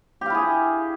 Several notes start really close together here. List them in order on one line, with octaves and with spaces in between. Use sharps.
G4 F5 E4 G#4